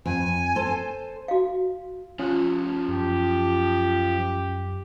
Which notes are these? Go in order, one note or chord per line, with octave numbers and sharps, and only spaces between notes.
F2 G#5
A4 C5
F#4 F5
F3 C#4 F4 F#5
F#2 G4